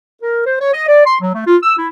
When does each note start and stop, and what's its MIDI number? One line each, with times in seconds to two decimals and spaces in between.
0.22 0.42 70
0.46 0.55 72
0.60 0.72 73
0.74 0.87 75
0.88 1.05 74
1.05 1.15 84
1.20 1.32 54
1.34 1.42 57
1.47 1.56 65
1.62 1.75 88
1.78 1.88 64